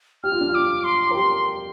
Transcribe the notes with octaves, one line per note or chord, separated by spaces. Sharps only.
G4 F6
F4
D4
F4
D6
C6
A#4
G4 C6